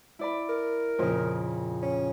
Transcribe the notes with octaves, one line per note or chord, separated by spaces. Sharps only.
E4 D5 B5
A#4
F2 A#2 C#3
C#4